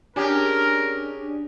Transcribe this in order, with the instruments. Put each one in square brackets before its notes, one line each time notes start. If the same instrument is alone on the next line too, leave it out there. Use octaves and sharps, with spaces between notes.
[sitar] C#4 G4 [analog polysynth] D4 G#4 [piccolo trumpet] A#4